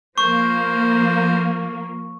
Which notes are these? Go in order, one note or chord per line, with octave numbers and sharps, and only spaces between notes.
F3 A#3 C5 C#6